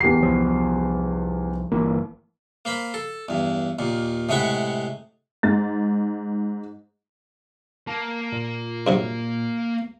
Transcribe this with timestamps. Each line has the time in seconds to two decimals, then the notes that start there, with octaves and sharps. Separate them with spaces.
0.01 D1 E2 G4 C7
0.22 C2 F3
1.72 G1 E3 A#3
2.65 A#3 C5 B5
2.94 A4
3.28 E2 G2
3.79 D#2 A#2
4.29 A2 C3 G#3 F#5 B5 C#6
5.43 G#2 A6
7.87 A#3 A5
8.32 A#2
8.87 G2 C3 F#3